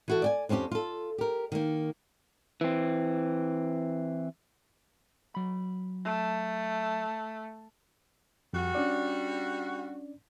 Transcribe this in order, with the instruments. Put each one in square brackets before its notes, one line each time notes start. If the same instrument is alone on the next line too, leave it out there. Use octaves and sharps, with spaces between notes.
[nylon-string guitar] E3 F#4 A4
D5 G5 G#5
F2 C4 C#4 E4 G4
F4 A4
G4 A#4
D#3 A#3
[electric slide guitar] E3 C4
[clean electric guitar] F#3 B5
[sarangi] A3
[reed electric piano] F2 [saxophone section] G3 F#4
[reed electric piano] C#4 D4 D5